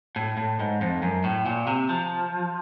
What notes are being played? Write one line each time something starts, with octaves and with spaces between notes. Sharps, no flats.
A2
A2
G#2
F2
F#2
A2
A#2
C3
F3